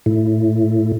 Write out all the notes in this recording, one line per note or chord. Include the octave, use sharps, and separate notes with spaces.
A2